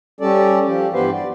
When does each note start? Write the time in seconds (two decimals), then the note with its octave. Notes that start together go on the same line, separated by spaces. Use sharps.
0.21 G3 C#4 A4 D5
0.67 F3 G4
0.94 G2 E3 B3 G4 B4 C5
1.12 D5